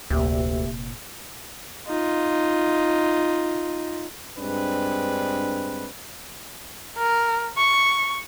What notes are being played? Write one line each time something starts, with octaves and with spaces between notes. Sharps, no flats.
F1 D2 A#2 A#3 G4 E5
D#4 F4
G2 G#3 C4 D4 B4
A#4
C#6